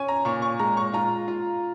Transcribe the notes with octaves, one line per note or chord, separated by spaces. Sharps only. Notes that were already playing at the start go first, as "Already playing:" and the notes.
Already playing: C#4 G#5 C#6
A#5
A#2 C#6
C#6
G#3 A#5
C#6
F4 A#5
F4